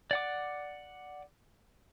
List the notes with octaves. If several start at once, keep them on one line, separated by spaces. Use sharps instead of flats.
D5 F#5 D6